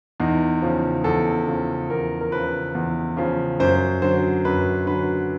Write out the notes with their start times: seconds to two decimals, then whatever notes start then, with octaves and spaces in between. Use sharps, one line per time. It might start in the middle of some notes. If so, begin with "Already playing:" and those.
0.20 E2 D#4
0.62 C#3 F3
1.04 E2 A4
1.47 C#3 F3
1.90 E2 A#4
2.21 A#4
2.32 C#3 F3 B4
2.75 E2
3.17 C#3 F3
3.60 F#2 C5
4.02 D3 F#3 C5
4.45 F#2 B4
4.87 D3 F#3 B4